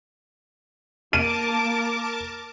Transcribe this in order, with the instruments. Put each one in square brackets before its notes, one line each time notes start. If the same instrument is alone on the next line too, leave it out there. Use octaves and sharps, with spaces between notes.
[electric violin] A#3 D7 [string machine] A#4 A5 D6 [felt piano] D#7